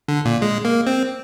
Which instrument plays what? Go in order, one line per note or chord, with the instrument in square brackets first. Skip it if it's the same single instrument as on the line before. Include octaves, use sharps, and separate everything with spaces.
[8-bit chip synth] D3
A#2
G#3
A#3
C4